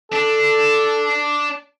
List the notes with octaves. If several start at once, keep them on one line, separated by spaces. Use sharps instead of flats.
D4 A4